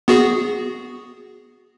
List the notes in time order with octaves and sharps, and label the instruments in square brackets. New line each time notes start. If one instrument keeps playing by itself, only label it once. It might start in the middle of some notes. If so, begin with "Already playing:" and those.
[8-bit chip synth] B3 F#4 G#4